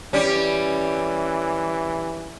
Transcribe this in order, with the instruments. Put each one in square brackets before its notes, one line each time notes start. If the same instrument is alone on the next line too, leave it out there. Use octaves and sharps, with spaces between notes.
[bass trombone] E3 [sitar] G3 C#4